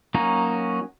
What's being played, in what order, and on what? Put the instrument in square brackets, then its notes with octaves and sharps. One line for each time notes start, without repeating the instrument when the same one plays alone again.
[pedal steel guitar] F#3 A#3 C#4 D#4